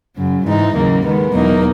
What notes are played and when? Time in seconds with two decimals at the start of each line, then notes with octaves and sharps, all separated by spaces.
0.15 F#2 C#3 F#3
0.45 G#2 E3 G#3 D#4
0.74 D#2 C#3 F#3 A#3
1.04 D#3 G#3 B3
1.33 E2 B2 F#3 A#3 D#4